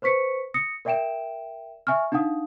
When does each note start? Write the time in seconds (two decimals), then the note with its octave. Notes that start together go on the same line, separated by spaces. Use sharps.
0.02 B4 C5 C#6 B6 C#7
0.54 D#6 A#6 C#7
0.85 A#4 D5 E5 G5 D7 E7
1.87 E5 G#5 C#6 F6
2.12 D4 D#4 F5 F#5 D#6